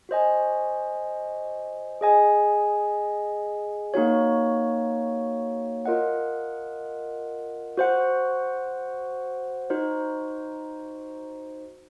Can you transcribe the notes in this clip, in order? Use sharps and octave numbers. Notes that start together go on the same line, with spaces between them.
F#4 C5 D#5 G#5
G#4 D#5 G#5
A#3 D#4 F#4 C#5
F4 A#4 D#5 F#5
F#4 C5 F#5
D#4 F#4 C5